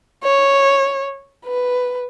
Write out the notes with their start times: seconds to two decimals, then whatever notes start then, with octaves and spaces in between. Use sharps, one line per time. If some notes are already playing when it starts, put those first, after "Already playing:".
0.23 C#5
1.46 B4